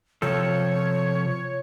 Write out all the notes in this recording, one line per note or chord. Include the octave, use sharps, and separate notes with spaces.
C3 F3 A4 C#5